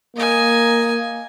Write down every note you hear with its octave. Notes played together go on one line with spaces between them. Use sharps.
A#3 D#5 G#5